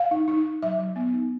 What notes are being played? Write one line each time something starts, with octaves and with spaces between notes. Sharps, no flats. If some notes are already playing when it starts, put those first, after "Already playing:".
Already playing: F5
D#4
D#4
D#4
F#3 E5
F#3
B3
D#4